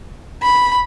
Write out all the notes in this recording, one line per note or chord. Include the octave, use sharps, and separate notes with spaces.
B5